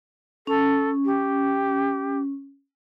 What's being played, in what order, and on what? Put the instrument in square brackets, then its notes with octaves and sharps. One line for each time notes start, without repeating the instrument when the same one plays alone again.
[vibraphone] C#4 [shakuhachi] A4
[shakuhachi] G4